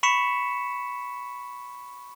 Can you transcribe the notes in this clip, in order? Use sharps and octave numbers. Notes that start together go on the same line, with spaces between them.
B5 C#6 B6 C#7 E7